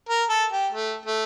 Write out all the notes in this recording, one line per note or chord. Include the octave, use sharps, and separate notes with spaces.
A#4
A4
G4
A3
A3